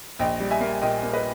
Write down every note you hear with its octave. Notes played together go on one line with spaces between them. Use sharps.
A#1 D#5 G5
G3
E5 G#5
A#3
A#2 D#5 G5
A#3
B4 D#5